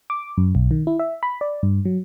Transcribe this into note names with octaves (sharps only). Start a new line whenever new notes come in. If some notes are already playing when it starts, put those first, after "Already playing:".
D6
F#2
B1
D#3
E4
E5
B5
D5
G2
F#3